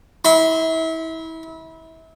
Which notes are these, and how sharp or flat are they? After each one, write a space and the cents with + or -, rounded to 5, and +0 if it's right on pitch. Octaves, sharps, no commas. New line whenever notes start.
E4 -30 C6 -45